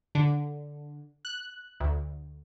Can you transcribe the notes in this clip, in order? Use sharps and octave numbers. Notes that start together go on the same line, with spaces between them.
D3
F#6
D2